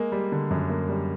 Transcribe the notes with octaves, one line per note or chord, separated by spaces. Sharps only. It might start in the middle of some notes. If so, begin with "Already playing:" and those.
Already playing: G#3 A#3
G3
D3
F#2
A#3
G3